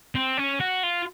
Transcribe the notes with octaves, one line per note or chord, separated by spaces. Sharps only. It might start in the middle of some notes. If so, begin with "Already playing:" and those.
C4
C#4
F#4
F4